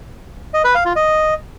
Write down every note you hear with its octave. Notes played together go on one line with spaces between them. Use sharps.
D#5
B4
F5
F4
D#5